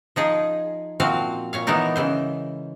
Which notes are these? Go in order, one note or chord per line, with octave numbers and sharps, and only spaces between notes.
F3 D#4 G#4
A#2 F3 C4 F#4 F5
A#2 C#5 F5
E3 G#3 B3 D#4 A#4
C#3 E3 C5